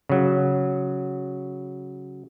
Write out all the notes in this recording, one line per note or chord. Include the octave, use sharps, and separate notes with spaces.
C#3 F#3